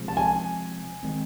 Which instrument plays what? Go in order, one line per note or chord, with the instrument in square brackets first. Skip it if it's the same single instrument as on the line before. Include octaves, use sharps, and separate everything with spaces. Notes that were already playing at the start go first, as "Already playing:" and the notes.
Already playing: [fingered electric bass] C3 F3 G#3
[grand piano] A5
G#5
[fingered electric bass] D#3 G#3 C4